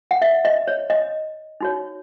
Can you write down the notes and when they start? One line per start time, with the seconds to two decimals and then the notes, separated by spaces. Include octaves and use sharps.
0.11 F#5
0.22 E5
0.45 D#5
0.68 C#5
0.90 D#5
1.61 D#4 F#4 C#5